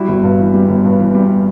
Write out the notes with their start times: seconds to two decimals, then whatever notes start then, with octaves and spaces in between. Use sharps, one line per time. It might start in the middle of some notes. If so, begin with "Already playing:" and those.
Already playing: G3 E4 F#4
0.08 G1
0.23 G2
0.39 E3
0.54 G3
0.69 G1
0.84 G2
1.00 E3
1.15 G3